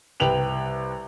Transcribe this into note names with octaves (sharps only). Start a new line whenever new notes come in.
C2 B4 G5 F7 F#7